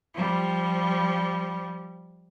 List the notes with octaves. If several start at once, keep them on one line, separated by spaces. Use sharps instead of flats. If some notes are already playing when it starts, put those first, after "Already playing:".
F3 G3